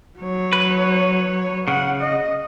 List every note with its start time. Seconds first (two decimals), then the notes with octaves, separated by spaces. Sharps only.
0.19 F#3 C#5
0.53 B4
1.68 C#3 F#5
2.01 D#5